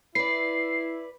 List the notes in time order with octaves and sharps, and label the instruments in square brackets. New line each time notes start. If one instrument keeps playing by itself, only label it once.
[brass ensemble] E4 [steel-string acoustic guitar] B4 D5 [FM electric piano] C7